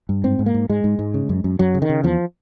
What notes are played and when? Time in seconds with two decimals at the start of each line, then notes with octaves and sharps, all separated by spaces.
0.09 G2
0.24 G#2 C4
0.39 G#2
0.46 A#3
0.54 G#2
0.69 G#2 G#3
0.84 G#2
0.99 G#2
1.14 C#3
1.29 F#2
1.44 F#2
1.59 F#2 F#3
1.74 C#3
1.82 D#3
1.89 C#3
2.04 E2 F3